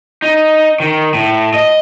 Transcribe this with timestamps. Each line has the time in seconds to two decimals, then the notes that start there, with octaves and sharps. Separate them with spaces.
0.22 D#4
0.80 D#3
1.14 A2
1.54 D#5